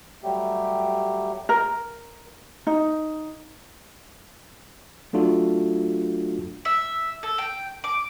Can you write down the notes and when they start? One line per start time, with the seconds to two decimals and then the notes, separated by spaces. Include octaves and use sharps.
0.23 F#3 G3 A3 G4
1.49 A#4
2.67 D#4
5.13 F#3 A3 D4 F4 F#4 A4
6.65 E5
7.23 A4
7.38 G5
7.84 D6